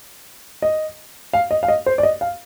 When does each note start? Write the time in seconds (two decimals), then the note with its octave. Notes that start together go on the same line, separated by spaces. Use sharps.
0.62 D#5
1.33 F5
1.51 D#5
1.63 F5
1.68 D#5
1.86 C5
1.98 D5
2.03 D#5
2.21 F5